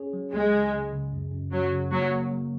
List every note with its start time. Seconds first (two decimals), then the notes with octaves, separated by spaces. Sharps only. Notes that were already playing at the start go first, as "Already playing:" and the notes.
Already playing: C#4 G#4 C#5
0.13 F#3
0.33 C#2 G#3
0.53 C#2
0.73 C#2
0.92 C#3
1.12 F#2
1.32 F#2
1.52 F#2 F#3
1.72 C#3
1.91 F#3 A#3
2.11 A#3
2.31 F#3